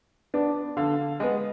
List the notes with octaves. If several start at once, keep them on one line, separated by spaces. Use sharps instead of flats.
B3 D4
D3 F5
G#3 B3